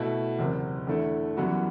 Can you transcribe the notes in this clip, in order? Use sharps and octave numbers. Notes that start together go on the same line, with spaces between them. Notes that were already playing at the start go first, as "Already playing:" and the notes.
Already playing: B2 A3 E4
F#1 E2 C3
E2 D3 A3 E4 A4
F#2 E3 G3 B3 F#4